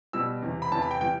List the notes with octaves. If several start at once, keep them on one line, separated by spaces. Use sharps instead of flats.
B2 G3 E6
E2 C3 E3
B5
E2 C3 E3 A5
B5
G5
E3 G3 G5